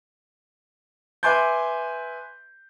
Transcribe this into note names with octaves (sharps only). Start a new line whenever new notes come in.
B4 E5 G#5 C6 D6 G6